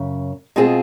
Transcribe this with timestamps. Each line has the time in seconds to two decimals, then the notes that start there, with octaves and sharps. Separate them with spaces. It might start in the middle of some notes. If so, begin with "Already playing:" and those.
Already playing: F#2 C#3
0.56 B2 G#3 C4 F4 G#4